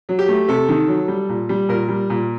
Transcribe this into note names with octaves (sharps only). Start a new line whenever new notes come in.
F#3
G4
A3
C3 A4
D#3
F#3
G3
A#2
G3
A#2 A#4
G3
A#2